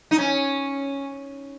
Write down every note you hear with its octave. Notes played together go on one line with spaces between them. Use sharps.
D#4
C#4